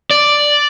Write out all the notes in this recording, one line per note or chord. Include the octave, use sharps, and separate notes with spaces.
D5